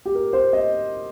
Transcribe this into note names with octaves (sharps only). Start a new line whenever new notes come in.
G4
A#4
C5
D#5